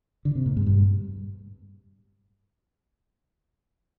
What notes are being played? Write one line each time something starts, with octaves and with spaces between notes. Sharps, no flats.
D3
C3
A#2
G#2
G2